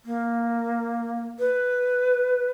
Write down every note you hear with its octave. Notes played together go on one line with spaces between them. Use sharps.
A#3
B4